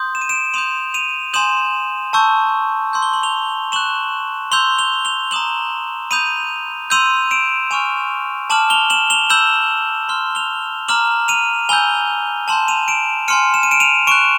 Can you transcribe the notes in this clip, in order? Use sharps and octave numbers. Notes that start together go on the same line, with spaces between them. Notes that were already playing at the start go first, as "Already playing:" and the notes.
Already playing: C6 D#6 G6
E7
D#7
D7 E7
C6 D#6 G6 D#7 F7
D#7 F7
G#5 C6 D#6 G6 E7 F#7
A5 C#6 E6 G6
C6 E6 G6
G7
F#7
F7 G7
C#6 F#6 E7 F#7
C6 E6 G6 F7 G7
F7 G7
F7 G7
A#5 D#6 G6 E7 F#7
B5 D#6 G6 D#7 F7
C6 E6 G6 D#7 F7
D7 E7
G#5 C#6 F6 D#7 F7
A5 D6 F6 E7 F#7
F7 G7
E7 F#7
F7 G7
B5 E6 G6 E7 F#7
C6 F6 G7
F7 G7
A#5 D6 F6 E7 F#7
D#7 F7
G#5 B5 E6 G6 F7 G7
A5 C6 E6 G6 E7 F#7
D#7 F7
D7 E7
G#5 C6 F6 C#7 D#7
E7
D#7
D7 E7
D#7 F7
C#6 F#6 D7 E7